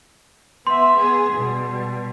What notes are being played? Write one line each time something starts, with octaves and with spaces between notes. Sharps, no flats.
B3 E5 C6
B3 G#4
B2 G3